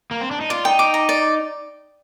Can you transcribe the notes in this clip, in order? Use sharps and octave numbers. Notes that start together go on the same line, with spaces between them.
A#3
C4
D4
D#4
F4 D5
D#4 G5
D6
A#5
D5